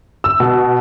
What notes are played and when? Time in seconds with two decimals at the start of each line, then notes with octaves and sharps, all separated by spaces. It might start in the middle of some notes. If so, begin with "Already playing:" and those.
0.24 E6
0.40 B2